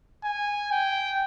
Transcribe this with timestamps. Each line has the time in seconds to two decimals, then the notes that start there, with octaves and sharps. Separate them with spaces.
0.24 G#5
0.71 G5